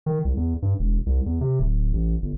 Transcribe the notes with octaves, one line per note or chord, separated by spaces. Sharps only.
D#3
C2
E2
G2
E1
C2
E2
C3
D1
A1
G1